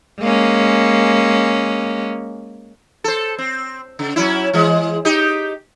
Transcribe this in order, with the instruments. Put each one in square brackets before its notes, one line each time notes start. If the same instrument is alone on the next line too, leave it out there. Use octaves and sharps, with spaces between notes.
[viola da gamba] G#3 A#3 C#4
[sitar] A4 C5
C4
C#3
F#3 C#4 E4
E3 G#3
D#4 G4